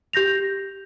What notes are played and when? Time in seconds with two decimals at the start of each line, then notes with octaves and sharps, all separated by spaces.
0.13 G4 G6 A#6 F7